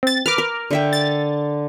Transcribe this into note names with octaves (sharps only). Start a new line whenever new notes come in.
C4 A6
A#4 B4 D6 F6
A#4
D3 E5 G5
A6